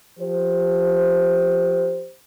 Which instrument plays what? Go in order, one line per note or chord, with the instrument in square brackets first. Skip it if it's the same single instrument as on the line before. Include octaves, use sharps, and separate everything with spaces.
[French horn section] F3 G4 C5